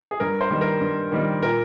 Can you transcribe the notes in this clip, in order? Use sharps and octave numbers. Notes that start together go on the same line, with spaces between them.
G#4
G2 A#4
C5
D#3 G3 A#3
A#4
G2
D#3 G3 A#3
A#2 A#4